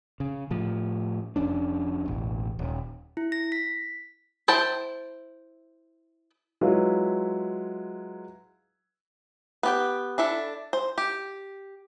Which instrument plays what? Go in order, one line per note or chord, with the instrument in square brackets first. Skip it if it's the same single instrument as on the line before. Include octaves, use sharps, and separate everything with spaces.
[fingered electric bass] C#3
A2 F3
F1 F2 C#4 D4
E1 A1
D#1
[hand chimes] E4
A#6
B6
[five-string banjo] E4 C5 G5 A5
[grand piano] F#3 G#3 E4 F4 B4
[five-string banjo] B3 G4 G5
D4 E4 A4
C5
G4